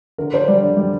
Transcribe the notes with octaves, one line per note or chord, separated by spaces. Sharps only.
D3 A#4
D4 C5
G3 D5
D3
G3